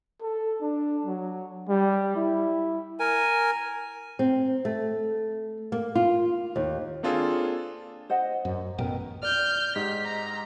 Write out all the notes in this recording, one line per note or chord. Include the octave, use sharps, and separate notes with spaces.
A4
D4
F#3
G3
E4
A#4 G#5
C4
A3
A#3
F4
D#2
A#3 C4 D4 F4 G#4 A4
C5 D#5 F#5
F#2
A1 F#2 B2 A4 A#4 G5
D5 F6 G6
G#2 G4 D#5 B6
A#5